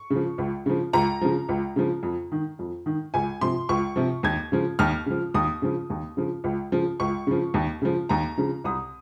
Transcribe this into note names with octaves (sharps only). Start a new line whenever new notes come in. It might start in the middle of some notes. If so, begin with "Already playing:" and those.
Already playing: C#6
C#3 F3
C#2
C#3 F3
C#2 A#5
C#3 F3
C#2
C#3 F3
F2
D#3
F2
D#3
C#2 G#5
C3 F3 C6
C#2 C#6
C3 F3
D#2 G#6
C#3 F3
D#2 F6
C#3 F3
D#2 D#6
C#3 F3
D#2
C#3 F3
C#2
C#3 F3
C#2 C#6
C#3 F3
D#2
C#3 F3
D#2 A#5
C#3 F3
C2 D#6